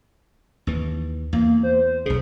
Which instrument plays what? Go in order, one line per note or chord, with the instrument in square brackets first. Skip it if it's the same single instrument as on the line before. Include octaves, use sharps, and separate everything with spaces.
[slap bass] D#2 E3
[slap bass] E2 [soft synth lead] A#3
[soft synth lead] C5
[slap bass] B1 C#3 [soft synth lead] G#4